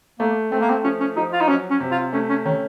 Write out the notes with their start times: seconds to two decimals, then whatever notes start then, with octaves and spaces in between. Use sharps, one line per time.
0.19 A3 A#3
0.51 A3 C4
0.61 A#3
0.69 C4
0.84 F3 C#4
1.00 C#4
1.16 F3 D#4
1.32 F4
1.41 D#4
1.48 F#3 C#4
1.70 C#4
1.80 C3
1.91 F4
2.13 A3 C#4
2.29 C#4
2.45 D#3 C#4